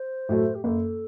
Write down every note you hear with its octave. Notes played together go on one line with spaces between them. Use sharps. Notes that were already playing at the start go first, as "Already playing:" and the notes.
Already playing: C5
A2 F#3 A3
G4
F#1 A4